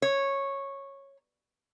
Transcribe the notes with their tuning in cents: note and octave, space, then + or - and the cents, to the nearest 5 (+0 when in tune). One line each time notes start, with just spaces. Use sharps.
C#5 -10